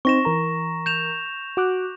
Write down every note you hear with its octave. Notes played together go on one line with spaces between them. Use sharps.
C4 D#4 C5 C#6 A#6 E7
E3 A#4 A#5
G6 E7 F7
F#4 D6 F#6